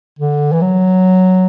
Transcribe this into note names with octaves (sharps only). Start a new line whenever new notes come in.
D3
E3
F#3